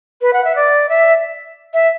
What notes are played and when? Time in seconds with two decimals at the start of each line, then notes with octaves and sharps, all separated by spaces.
0.21 B4
0.33 F#5
0.44 E5
0.55 D5
0.89 E5
1.73 E5